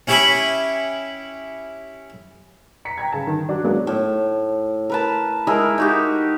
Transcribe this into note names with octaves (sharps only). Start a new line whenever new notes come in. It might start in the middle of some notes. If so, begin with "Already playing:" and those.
C#4 E4 G4 C#5 G#5 B5
A#5 B6 C#7
G5 A#5 G#6
C#3 A5
D#3
F#3 G3 D4 F#4
F#3 G#3 A#3 B3 C#4 D4
A2
A#4 B4 A5
G#3 E4 A#4 D#5
D#4 F#4 G4